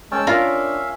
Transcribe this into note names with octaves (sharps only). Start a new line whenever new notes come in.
G#3 C#4 G5 A5 E6
D4 F4 A#4 E5 F5